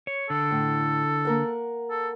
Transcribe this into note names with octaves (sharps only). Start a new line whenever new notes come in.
C#5
D3 A4
A2
A#3 A#4 F#5
A4